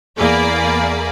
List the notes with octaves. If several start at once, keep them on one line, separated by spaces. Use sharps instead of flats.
E2 A#3 G#4 D5 B5